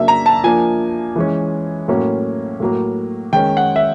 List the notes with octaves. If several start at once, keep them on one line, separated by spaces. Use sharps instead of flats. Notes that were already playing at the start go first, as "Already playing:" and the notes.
Already playing: C#3 F#3 A#3 D4 E5
A#5
A5
F3 A#3 D4 G#5
E3 G#3 C#4
A2 F#3 A#3 C#4
A2 F#3 A#3
D#3 G#3 C#4 G5
F#5
E5